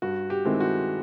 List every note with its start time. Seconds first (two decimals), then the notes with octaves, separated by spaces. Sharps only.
0.02 G2 F#4
0.30 G4
0.45 D#3 G#3 C4 E4
0.60 F#4